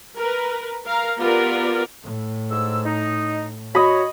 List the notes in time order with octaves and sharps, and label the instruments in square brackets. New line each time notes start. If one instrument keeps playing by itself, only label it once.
[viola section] A#4 B4
A#4 F5 A#5
B3 F4 G4 A#4 D5
[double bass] A2
[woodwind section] G#2 E6
D#4
[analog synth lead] F#4 [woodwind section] C#5 [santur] D#5 B5